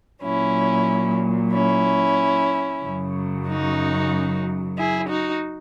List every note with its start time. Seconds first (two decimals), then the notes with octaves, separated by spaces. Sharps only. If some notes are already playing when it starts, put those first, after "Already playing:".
0.22 A#2 F#3 C#4 E4
1.53 C#4 E4
2.83 F#2 C#3 F#3
3.47 D#4 F#4
4.77 E4 G#4
5.09 D#4 F#4